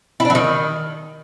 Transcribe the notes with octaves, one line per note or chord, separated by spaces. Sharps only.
E4
D4
F#3
D#3